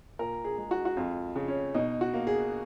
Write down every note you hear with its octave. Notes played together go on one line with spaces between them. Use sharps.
A#2 A#4
G#4
G#3
F#4
F#4
F2 F4
C#3
C#4
B2 D#4
F#4
A#3
G#4